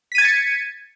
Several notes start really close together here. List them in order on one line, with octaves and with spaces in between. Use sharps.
B6 D#7 G#6 A6 C#7